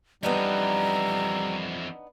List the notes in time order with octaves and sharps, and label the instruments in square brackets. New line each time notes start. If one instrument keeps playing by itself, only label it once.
[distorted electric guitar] F2 E3 [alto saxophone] G3 [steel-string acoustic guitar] B3 D4 D#4 [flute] A#5